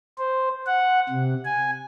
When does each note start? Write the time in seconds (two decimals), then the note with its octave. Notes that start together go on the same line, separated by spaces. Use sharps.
0.19 C5
0.66 F#5
1.09 C3
1.45 G#5